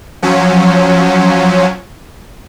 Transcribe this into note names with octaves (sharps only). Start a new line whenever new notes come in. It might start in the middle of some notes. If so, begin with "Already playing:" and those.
F3 F#3 C#4